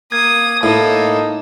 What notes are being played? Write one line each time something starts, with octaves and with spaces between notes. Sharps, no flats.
A#3 D#6 G#6
A2 A#3 D#4 A4